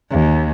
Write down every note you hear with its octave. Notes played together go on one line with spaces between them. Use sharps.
D#2